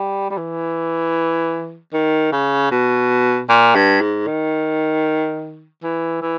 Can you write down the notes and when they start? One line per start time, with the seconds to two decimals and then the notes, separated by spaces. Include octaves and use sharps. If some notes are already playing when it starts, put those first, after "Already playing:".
Already playing: G3
0.30 G3
0.37 E3
1.93 D#3
2.32 C#3
2.71 B2
3.49 A#2
3.75 G2
4.01 G#2
4.27 D#3
5.83 E3
6.22 E3